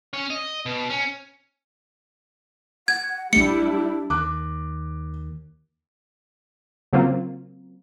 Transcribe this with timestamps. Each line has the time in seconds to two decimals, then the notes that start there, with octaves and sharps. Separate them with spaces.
0.13 C#4 C#5
0.30 D#5
0.66 B2
0.90 C#4
2.88 F#5 G#6
3.33 A#1 G3 A3 D4 E4 C#7
4.10 D#2 D6 F#6
6.93 C#3 F#3 A#3 C4 F4